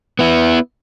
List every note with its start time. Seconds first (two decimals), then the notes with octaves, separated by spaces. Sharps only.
0.19 B3 E4